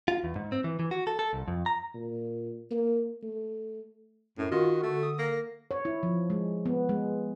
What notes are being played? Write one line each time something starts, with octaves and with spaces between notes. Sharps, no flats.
F4
E2
G#2
C4
E3
E3
F#4
A4
A4
C2
F2
A#5
A#2
A#3
A3
F#2 A2
D#3 F4 F#4
D3 A3
D#6
A#3 A#6
C#5
E4
F3
G#3
B3
G#3